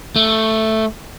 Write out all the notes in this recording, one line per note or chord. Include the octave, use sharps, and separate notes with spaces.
A3